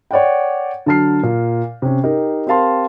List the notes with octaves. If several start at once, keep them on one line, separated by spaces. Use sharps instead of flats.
C#5 D5 F#5 G5
D3 F#3 A5 F6 C7
A#2
C3 C#4
D#4 G4 A#4
C4 G4 A#4 F5 A5 C6